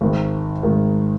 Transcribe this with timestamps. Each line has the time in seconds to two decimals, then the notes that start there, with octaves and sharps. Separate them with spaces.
0.01 G#1 G#2 D#3
0.63 G#1 G#2 D#3